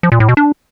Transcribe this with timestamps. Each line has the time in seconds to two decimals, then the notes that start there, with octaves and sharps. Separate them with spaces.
0.03 F3
0.12 A#2
0.20 A2
0.29 B2
0.37 D4